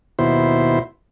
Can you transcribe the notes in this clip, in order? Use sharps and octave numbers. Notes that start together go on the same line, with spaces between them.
D#2 B2 E4 C5